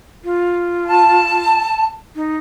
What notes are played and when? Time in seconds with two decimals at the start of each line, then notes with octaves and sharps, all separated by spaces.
0.24 F4
0.87 A5
2.16 D#4